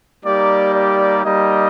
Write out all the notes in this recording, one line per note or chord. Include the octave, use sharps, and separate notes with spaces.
G3 A#3 D#4 G4 D5
D5
G3 A#3 D#4 G4 D#5